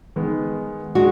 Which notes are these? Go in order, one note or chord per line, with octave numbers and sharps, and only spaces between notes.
D#3 G#3 B3
G#3 D4 F#4